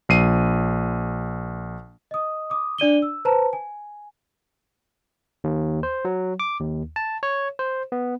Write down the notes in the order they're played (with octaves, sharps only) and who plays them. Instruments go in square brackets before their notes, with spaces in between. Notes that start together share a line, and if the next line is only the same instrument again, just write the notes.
[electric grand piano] A#1 C7 D#7
[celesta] D#5 D#6
D6 D#6
D4 D5 D#7 G7
E6
B4 C5 A5 A#5
G#5
[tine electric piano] D#2
C5
F#3
D6
D#2
A5
C#5
C5
B3